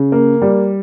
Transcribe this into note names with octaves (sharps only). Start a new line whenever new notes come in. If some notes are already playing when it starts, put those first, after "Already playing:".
Already playing: C#3
A#3
G3